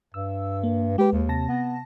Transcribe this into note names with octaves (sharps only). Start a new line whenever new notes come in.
G2 E6
A#3
G#3 G4 B4
D#2
C3 A5 A#6
B3